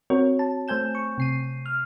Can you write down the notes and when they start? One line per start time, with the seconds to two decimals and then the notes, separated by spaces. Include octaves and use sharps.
0.10 C4 F#4 A#4 C#5
0.39 A5
0.68 A3 C5 G#5 G6 E7
0.95 C#6
1.18 C3 C7 D#7
1.66 F6